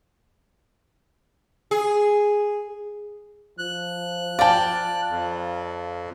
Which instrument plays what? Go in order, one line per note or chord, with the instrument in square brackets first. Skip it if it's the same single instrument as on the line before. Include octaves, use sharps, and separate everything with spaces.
[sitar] G#4
[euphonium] F3 [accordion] F#6
[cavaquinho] D5 G5 [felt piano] F5 A5
[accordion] F2